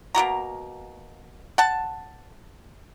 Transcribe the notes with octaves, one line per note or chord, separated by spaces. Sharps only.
B2 A#3 F#4 A#5
F#5 A5